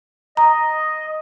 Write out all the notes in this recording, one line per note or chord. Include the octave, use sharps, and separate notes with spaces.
D#5 A#5